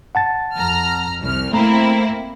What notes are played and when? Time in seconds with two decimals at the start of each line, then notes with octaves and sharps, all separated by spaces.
0.15 F#5 A5 A6
0.57 F2 A#5 F6
1.21 C2 F6
1.53 A3 A#3 C4 E4 A#5